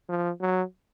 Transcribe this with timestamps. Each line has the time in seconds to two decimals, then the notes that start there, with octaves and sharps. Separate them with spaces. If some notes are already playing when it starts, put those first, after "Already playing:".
0.09 F3
0.41 F#3